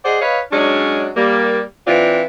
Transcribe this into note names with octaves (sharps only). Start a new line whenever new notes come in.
G#4 C5 D5 D#5 F#5
B4 C#5 D#5 F5
F#3 G#3 C#4 D4
G3 A#3
E3 C4 D4 F4